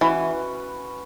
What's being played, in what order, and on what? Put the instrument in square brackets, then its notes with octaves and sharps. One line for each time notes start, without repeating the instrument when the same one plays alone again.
[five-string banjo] E3 [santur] C#4 F#4 B4